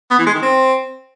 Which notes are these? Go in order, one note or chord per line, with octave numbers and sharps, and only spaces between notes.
B3
E3
G#3
D#3
C4